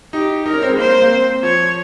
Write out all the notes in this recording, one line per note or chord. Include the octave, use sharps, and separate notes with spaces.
D#4 G4
D#4 A#4
C#4
C4
G#3
A#3 C5
A#3
C4
F3 C#5